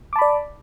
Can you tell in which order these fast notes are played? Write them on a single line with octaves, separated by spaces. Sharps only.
D6 A5 B5 D5